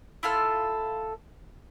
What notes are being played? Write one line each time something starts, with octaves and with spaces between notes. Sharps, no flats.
E4 F4 A4 F6